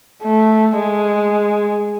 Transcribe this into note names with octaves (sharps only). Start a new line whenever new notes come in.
A3
G#3